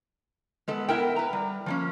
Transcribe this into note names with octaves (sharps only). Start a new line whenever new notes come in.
G#3 B3 A4
B3 E4 A#4 G5
B4 A#5
G3
F3 A#3 C#4